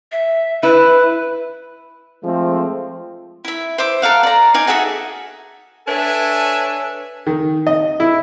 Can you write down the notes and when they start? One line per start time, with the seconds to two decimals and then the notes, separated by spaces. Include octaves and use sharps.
0.12 E5
0.63 E4 B4
2.24 F3 G#3 A3 C4
3.45 E4 E5
3.78 C5 E5 D6
4.02 A4 A#4 F5 F#5
4.23 D5 A#5
4.54 D#4 F5 G#5 D6
4.67 F#4 G#4 A4 E5
5.88 D4 A4 B4 C#5 E5 G#5
7.27 D#3
7.67 D#5
8.00 E4